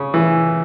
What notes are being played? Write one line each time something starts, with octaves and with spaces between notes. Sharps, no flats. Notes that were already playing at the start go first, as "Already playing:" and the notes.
Already playing: C#3
E3